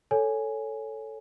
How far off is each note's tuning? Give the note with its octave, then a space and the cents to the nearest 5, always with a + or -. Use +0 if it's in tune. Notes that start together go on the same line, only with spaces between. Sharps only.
A4 +0 C#5 +5 G#5 +0